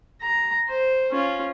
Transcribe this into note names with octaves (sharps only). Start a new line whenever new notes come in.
A#5
C5
C#4 F4